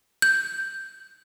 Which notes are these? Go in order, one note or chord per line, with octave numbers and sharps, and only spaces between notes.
G6